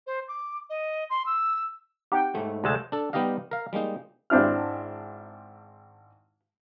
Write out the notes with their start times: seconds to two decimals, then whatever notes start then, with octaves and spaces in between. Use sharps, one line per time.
0.07 C5
0.28 D6
0.70 D#5
1.10 C6
1.26 E6
2.12 C4 D#4 G4 F#5 G5
2.35 G#2 A3
2.64 D2 C3 G#3 A4 A5 G6
2.92 D4 A4
3.13 G3 B3 D#4 G4 D#5 F5
3.51 A#4 F5
3.73 G3 G#3 A#3 D#4
4.30 G#1 C4 D4 E4 F6